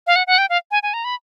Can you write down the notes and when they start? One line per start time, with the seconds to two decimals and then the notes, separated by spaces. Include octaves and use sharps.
0.07 F5
0.16 F#5
0.27 F#5
0.38 G5
0.50 F5
0.71 G#5
0.83 G#5
0.94 A#5
1.04 B5